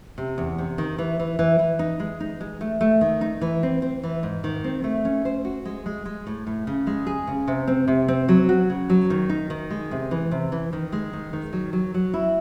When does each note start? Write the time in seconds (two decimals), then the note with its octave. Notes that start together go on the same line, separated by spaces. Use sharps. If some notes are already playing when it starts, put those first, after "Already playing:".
0.18 C3
0.38 E2
0.58 C3
0.78 D#3
0.98 E3
1.19 E3
1.39 E3
1.59 E3
1.79 D#4
2.00 G#3
2.20 D#4
2.41 G#3
2.61 A3
2.81 A3
3.01 D#3
3.21 D#4
3.41 E3
3.63 C4
3.82 C4
4.03 E3
4.23 G#2
4.44 D#3
4.64 C4
4.84 A3
5.05 C#4
5.25 C5
5.45 F#4
5.65 G#3
5.86 G#3
6.05 G#3
6.27 A2
6.47 A2
6.67 C#3
6.87 G#3
7.07 G#4
7.27 C#3
7.47 C3
7.67 C4
7.88 C3
8.08 C4
8.29 F#3
8.49 F#4
8.70 C#3
8.90 F#3
9.10 D#3
9.30 D#4
9.50 D#3
9.70 G#3
9.91 C3
10.11 E3
10.31 C3
10.52 E3
10.73 D#3
10.92 G#3
11.13 D#3
11.33 D#3
11.53 F#3
11.73 F#3
11.94 F#3
12.14 E4